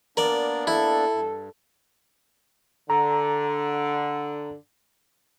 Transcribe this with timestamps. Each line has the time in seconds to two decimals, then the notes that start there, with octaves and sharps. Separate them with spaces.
0.17 A#3 B3 D4 A#4 D5
0.67 E4 A4
1.13 G2
2.90 D3 A#5